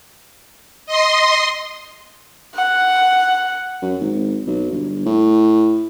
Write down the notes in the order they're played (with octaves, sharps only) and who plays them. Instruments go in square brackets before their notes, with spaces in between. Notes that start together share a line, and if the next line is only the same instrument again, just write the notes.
[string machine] D#5 C6
[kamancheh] F#5
[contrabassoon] F#2
G#1
B1
G1
A2